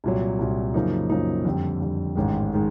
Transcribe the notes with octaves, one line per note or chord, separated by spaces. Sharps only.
C2 A#2 F#3
C2 A#2 F#3
F#2 C#3 F3 A#3 D#4
F#2 C#3 F3 A#3 D#4
F2 D3 G3
F2 D3 G3
A1 G#2 D#3 G#3
D#3 G#3